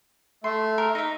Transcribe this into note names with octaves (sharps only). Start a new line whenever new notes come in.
A3 C6
A#4
D#4 E5